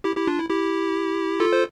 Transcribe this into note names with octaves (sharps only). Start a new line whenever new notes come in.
E4 G4
E4 G4
D4 F4
E4
E4 G4
F4 A4
C5